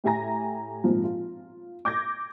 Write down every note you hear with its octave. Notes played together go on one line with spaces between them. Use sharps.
A2 G4 E5 G#5 A#5 A#6
G#1 A#2 F3
F4
D6 G6 G#6 A#6